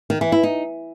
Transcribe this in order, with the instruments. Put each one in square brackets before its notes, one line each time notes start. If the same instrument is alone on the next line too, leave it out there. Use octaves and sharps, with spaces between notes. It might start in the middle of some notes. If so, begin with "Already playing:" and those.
[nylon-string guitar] D#3
E3
E4
D#4